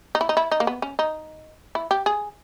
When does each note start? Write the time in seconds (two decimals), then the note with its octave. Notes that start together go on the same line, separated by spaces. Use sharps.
0.15 D#4
0.21 E4
0.29 D#4
0.37 E4
0.51 D#4
0.60 A#3
0.67 B3
0.82 C#4
0.99 D#4
1.75 E4
1.91 G4
2.06 G#4